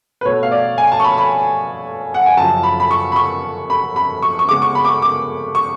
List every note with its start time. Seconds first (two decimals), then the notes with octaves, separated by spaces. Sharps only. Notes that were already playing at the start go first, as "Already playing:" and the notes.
0.21 B4
0.25 B2 A3 C#5
0.43 F5
0.52 D5
0.78 G#5
0.92 A5
1.00 C#6
1.04 B5
1.18 B5
2.14 F#5
2.26 G#5
2.37 F#2 C#3 F3 A5
2.63 B5
2.80 B5
2.91 C#6
3.12 B5
3.16 C#6
3.70 B5
3.96 B5
4.22 C#6
4.39 C#6
4.49 C#3 G#3 B3 D6
4.62 C#6
4.75 B5
4.85 D6
4.89 C#6
5.02 D6
5.55 C#6